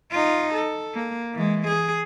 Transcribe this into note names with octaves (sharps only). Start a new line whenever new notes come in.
D#4 F4
A4
A#3
E3 G#3
G#4